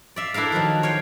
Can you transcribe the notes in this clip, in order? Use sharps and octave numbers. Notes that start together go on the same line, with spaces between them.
D5 E5 F5
D4 E4 A4 A#4 F5
D#3 F3 F#3 D#4
C#5 F5 G5